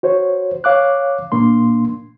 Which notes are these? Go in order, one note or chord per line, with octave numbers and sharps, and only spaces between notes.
F#4 C5 C#5
C#5 F5 D6 F#6
A#2 A#3 D4 C6